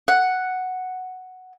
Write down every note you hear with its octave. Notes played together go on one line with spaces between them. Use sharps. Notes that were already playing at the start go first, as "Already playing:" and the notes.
F#5